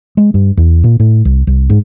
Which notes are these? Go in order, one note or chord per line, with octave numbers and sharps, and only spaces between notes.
G#3
G2
E2
A#2
A2
C2
C2
G#2